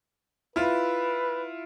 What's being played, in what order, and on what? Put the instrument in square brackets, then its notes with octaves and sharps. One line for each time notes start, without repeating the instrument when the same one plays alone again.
[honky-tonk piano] E4 F4 [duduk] B4